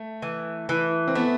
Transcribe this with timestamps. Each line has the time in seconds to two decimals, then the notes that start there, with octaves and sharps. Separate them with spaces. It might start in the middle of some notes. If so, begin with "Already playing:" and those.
Already playing: A3
0.22 E3
0.69 E3
1.08 C4
1.15 A3 B3